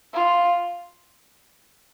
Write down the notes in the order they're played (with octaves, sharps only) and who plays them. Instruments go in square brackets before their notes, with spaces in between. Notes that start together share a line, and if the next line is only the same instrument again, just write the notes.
[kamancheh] F4